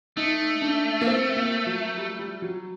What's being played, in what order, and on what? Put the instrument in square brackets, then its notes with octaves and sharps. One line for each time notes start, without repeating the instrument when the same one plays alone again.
[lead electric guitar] A3 [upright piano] D#4
[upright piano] D4
A#3
C4
A#3
F#3
G3
G3
F#3